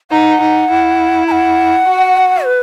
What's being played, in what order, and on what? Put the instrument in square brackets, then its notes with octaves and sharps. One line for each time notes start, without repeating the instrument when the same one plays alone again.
[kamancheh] D#4 [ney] F#5
[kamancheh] D#4
E4
[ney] A#5
F#5
[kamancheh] F#4
[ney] B4